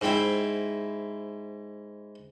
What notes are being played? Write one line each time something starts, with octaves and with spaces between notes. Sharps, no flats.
G#2 C4 E4